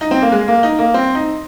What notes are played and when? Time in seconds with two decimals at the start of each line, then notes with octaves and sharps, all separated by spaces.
0.01 D#4
0.11 C4
0.22 A#3
0.32 G#3
0.48 A#3
0.63 D#4
0.79 A#3
0.94 C4
1.15 D#4